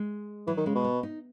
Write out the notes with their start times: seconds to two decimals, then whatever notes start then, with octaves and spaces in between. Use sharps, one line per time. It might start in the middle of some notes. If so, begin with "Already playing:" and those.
Already playing: G#3
0.47 E3 F#3
0.57 D#3
0.66 C#3 G#3
0.75 B2
0.84 B3
1.03 D#4